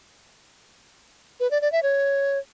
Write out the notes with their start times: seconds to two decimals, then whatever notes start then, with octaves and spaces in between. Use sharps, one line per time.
1.40 B4
1.51 D5
1.61 D5
1.72 E5
1.83 C#5